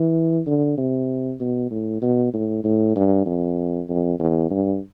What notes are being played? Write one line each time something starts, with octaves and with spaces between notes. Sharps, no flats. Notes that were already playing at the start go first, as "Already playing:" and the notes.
Already playing: E3
D3
C3
B2
A2
B2
A2
A2
G2
F2
F2
E2
G2